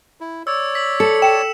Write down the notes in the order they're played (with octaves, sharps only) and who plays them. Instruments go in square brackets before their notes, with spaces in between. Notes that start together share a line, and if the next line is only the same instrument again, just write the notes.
[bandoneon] E4
[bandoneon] C#5 D5 [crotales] E6
[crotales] B6 F#7
[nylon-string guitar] A4 [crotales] C#7
[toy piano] G5 [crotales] E7